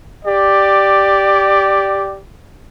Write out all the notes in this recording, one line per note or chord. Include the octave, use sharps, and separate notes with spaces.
G4 D5